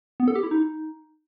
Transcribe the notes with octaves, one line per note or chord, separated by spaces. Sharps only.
B3
A4
G4
E4
D#4